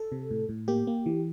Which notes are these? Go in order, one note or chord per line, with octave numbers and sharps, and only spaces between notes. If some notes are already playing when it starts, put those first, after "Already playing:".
Already playing: A4
C3
A2
A2
A#3 G4
A#3
E3